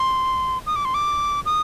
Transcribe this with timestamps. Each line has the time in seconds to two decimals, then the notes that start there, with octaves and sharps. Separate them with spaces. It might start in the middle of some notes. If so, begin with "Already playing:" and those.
Already playing: C6
0.67 D#6
0.76 D6
0.85 C6
0.94 D6
1.46 D#6